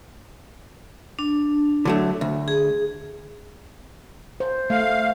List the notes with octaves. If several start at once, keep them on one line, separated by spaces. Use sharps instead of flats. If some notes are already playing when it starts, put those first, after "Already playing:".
D4
D3 F#3 A3
D2
G#4
C5
A3 F5